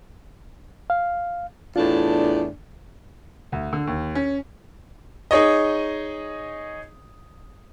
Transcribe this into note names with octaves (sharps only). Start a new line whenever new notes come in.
F5
E2 A2 D4 F4
D2
D3
D#2
C#4
D#4 G#4 C#5 D#5